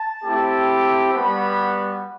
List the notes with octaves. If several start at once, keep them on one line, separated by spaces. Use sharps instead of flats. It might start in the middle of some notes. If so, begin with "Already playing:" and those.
Already playing: A5
A3 C4 E4 G4
G3 B3 F#4 B5